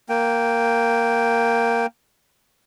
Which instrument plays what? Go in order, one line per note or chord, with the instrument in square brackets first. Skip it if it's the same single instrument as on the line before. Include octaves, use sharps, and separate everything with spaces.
[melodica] A#3 G5